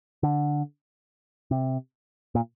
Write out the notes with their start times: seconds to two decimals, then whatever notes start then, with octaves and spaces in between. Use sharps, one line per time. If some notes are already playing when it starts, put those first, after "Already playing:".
0.23 D3
1.51 C3
2.35 A#2